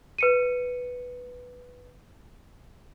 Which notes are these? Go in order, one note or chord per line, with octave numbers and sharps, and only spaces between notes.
B4 C#7 D#7